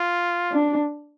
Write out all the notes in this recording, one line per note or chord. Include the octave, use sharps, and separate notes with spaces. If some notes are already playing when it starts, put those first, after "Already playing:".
Already playing: F4
D4